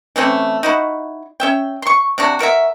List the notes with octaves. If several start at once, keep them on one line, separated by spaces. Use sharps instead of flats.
E3 A3 C4 C#4
D#4 E4 F#4
C#4 E5 G5
C6 C#6
C3 D4 F#4
F#4 A#4 B4 E5